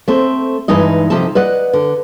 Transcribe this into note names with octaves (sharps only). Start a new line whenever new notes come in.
A3 C4 C5
G2 E3 G#3 D#4 D#5
C3 F3 D#4 A4 A5
B4 D5 D#5 F#5
D3